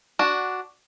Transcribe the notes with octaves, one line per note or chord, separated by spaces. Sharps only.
D4 F#4